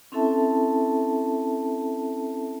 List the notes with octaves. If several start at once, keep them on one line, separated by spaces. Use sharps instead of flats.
C4 C#4 E4 A4 E5 A5